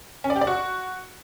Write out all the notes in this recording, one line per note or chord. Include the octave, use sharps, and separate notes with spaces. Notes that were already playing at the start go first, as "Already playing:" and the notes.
C#4
D5
G4
D5
F#4